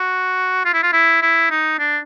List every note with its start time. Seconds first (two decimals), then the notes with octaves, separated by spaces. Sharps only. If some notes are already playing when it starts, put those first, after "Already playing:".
Already playing: F#4
0.65 F4
0.74 E4
0.83 F4
0.93 E4
1.22 E4
1.51 D#4
1.79 D4